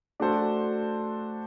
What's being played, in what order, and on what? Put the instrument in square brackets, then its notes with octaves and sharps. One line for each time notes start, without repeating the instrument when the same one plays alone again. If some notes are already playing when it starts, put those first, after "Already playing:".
[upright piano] A3 D4 F#4 A4 C5